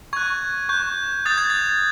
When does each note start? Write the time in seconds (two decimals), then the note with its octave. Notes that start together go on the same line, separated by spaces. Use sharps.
0.13 C#6 F#6 G#6
0.69 C#6 F#6 G6
1.26 D#6 G6 A6
1.38 G#6
1.50 A6